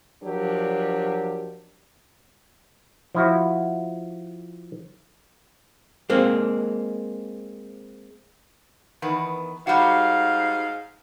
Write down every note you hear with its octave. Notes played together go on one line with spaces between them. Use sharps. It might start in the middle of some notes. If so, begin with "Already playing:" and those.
F3 F#3 D4 G4 A#4
F3 E4 F#4
G#3 A#3 C4
E2 D#3 B3
G#2 G3 F#4 F5